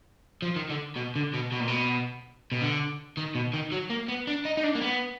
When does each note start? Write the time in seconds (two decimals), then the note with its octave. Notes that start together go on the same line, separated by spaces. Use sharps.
0.42 F3
0.56 D#3
0.70 D3
0.96 B2
1.16 D3
1.33 B2
1.52 B2
1.60 A#2
1.67 B2
2.52 B2
2.61 D3
3.17 D#3
3.35 B2
3.54 D#3
3.72 F#3
3.90 A#3
4.09 B3
4.27 D4
4.45 D#4
4.57 D#4
4.64 D4
4.75 A#3
4.82 B3